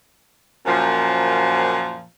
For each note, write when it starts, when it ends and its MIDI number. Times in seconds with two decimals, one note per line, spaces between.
0.66 2.03 42
0.66 2.03 46
0.66 2.03 53